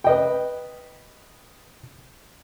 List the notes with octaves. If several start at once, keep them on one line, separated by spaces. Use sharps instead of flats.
B4 D#5 G5